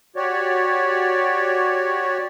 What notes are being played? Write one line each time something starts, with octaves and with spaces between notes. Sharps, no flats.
F#4 G4 C#5 D5